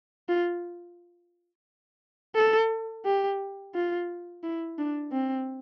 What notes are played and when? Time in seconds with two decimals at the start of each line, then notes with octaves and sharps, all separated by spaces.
0.29 F4
2.36 A4
3.05 G4
3.74 F4
4.43 E4
4.78 D4
5.12 C4